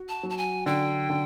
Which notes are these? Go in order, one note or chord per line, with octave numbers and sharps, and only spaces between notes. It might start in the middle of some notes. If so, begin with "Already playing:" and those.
Already playing: F#4
A5
F#3
A5
G#5
D3 G5
D3